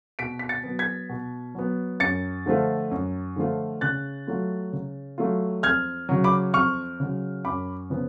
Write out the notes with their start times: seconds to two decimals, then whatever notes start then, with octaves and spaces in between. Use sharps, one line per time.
0.19 B2 B6 D7
0.39 B6
0.49 A6 C#7
0.64 F#3 B3
0.79 G#6 B6
1.09 B2
1.55 F#3 B3
2.00 F#2 A6 C#7
2.46 D3 F3 A3 F4
2.91 F#2
3.36 D3 F3 A3 F4
3.81 C#3 F#6 A6
4.27 F#3 A3 F4
4.73 C#3
5.18 F#3 A3 F4
5.63 F2 F6 G#6
6.09 C#3 F#3
6.24 B5 D6
6.54 F2 C#6 F6
7.00 C#3 F#3
7.45 F#2 B5 D6
7.90 C#3 F3 B3